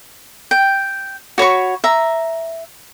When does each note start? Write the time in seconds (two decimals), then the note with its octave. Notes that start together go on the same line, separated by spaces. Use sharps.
0.51 G5
1.38 F#4 C#5 B5 C#6
1.84 E5 A#5